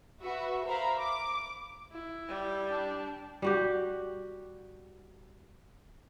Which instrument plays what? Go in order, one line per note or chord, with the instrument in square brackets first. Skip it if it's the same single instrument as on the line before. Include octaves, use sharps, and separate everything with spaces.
[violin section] F#4 B4 E5
A#4 C5 E5 F5 A#5 B5
D6
[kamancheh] E4
[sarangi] G3
[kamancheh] D4
[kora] G3 F#4 G4